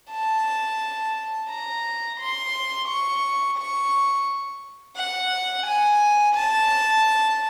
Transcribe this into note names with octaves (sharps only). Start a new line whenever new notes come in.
A5
A#5
C6
C#6
C#6
F#5
G#5
A5